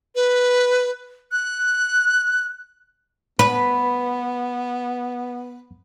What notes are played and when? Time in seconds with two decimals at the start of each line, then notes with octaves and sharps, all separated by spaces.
0.15 B4
1.32 F#6
3.39 B3 B4 B5